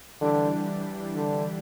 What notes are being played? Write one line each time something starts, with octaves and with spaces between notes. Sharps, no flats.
D3 E3 G3 D4 G4
D3